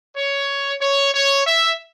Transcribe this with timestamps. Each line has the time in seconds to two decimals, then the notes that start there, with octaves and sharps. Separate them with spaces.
0.16 C#5
0.81 C#5
1.14 C#5
1.46 E5